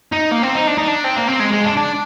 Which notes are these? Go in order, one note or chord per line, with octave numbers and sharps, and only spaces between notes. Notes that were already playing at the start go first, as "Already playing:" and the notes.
D#4
A#3
C4
D#4
D4
D#4
D4
C4
A#3
C4
G#3
G#3
D4
D4